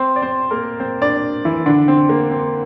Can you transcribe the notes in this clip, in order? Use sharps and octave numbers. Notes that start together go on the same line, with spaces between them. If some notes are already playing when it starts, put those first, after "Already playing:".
Already playing: C4 C5
D5
C4 C5
A#3 A#4
C4 C5
D4 D5
E3 E4
D3 D4
C4
A#3
C4